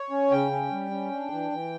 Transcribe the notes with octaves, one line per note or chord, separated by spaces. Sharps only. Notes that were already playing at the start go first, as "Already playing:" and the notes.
Already playing: C#5
C#4
C#3 G5
C#4
G3
C#4
D4
E3
E3